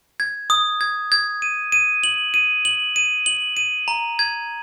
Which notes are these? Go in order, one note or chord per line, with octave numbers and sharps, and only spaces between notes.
G#6
D#6
G#6
G#6
D#7
D#7
F#7
D#7
F#7
D#7
F#7
D#7
A#5
G#6